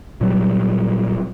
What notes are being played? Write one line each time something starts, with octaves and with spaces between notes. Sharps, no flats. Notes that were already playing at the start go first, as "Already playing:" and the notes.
A#2 F#3 G3